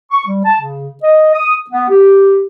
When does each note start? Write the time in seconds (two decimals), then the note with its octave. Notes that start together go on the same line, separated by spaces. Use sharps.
0.11 C#6
0.27 G3
0.45 A5
0.61 C#3
1.03 D#5
1.34 D#6
1.71 B3
1.90 G4